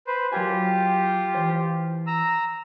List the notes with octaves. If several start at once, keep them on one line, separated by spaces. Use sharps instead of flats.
B4 C5
F#3 F4 G4 A#4 G#5
E3 C5
A#5 E6